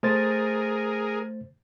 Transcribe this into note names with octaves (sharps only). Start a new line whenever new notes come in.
A3 G#4 A#4 C5 A6